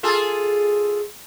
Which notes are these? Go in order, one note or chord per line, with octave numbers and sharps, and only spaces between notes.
F4 G#4 A4